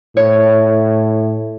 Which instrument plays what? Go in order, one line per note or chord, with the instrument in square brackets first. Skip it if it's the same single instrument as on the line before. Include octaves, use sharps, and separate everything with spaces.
[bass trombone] A2 [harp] C#5